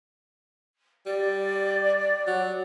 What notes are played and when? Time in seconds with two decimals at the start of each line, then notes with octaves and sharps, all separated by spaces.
1.06 G3 D5
2.27 F#3